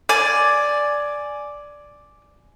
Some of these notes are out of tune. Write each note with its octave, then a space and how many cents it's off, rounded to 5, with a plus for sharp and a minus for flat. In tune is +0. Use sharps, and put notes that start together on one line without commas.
D5 +0 G#5 +10